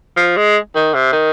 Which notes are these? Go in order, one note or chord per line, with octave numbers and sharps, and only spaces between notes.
F3
G#3
D#3
C3
D#3